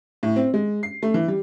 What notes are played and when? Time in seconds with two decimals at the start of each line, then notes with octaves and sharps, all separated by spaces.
0.23 A2
0.36 C4
0.54 G#3
0.83 C7
1.03 A3
1.14 E3
1.28 G3